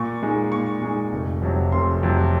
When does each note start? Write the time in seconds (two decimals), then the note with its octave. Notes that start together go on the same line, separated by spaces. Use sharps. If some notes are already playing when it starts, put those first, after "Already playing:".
Already playing: A#2 C#6
0.22 G#3 D#4
0.52 A#2 C#6
0.82 G#3 D#4
1.13 F1
1.42 F2 C3 F#3
1.72 F1 C6
2.03 F2 C3 F#3